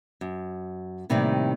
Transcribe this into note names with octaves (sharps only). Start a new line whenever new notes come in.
F#2
A2 C3 D#3 G3 A#3 C4